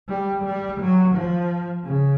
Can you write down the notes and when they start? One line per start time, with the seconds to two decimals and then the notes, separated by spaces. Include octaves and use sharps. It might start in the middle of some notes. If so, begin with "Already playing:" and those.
0.08 G3
0.44 G3
0.80 F#3
1.15 F3
1.85 C#3